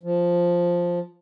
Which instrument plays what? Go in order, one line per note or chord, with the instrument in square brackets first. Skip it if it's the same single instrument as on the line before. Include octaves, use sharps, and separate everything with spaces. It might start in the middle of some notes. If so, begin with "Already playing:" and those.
[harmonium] F3